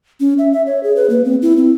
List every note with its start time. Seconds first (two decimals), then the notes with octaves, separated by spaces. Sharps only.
0.20 C#4
0.38 E5
0.53 E5
0.66 C#5
0.83 G#4
0.96 B4
1.10 A#3
1.25 C4
1.42 E4
1.57 C4